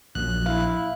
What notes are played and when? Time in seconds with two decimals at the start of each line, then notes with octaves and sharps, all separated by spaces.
0.15 A#1 F#2 F#6
0.46 E4 F5